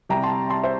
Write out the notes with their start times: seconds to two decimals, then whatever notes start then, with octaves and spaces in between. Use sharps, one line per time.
0.09 C2 C3 G3 G5 A#5
0.23 A5 C6
0.50 A5 C6
0.63 C5 E5